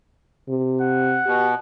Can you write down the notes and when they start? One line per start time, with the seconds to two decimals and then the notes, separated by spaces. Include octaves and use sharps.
0.49 C3
0.82 F#5
1.26 B2 G4